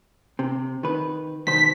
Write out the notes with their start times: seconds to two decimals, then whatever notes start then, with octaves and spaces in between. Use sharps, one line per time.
0.39 C3
0.83 D#3 B4
1.47 B1 D#3 C5 B6